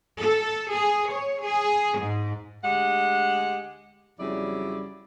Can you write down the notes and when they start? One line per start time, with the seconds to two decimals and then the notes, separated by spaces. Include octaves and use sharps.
0.20 A4
0.71 G#4
1.10 C#5
1.44 G#4
1.98 G#2
2.64 D2 G#3 G4 F#5
4.19 F2 C#3 F#3 G3 E4 D5